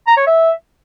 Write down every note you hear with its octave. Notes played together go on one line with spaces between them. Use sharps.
A#5
C#5
E5